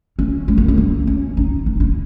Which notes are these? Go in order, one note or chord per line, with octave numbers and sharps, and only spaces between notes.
C#4
G#3
A#3
C#4
A#3
C#4
D#4
C#4
D#4